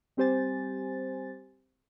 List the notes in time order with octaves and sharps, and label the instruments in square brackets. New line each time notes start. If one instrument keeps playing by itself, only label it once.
[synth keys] G3 C4 G4 C5 G#5 A6